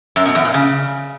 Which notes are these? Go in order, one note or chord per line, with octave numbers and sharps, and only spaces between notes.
F#2
B2
E2
A#2
C#3